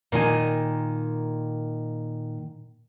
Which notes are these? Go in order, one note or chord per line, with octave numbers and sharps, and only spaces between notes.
A#2 D#3 G#5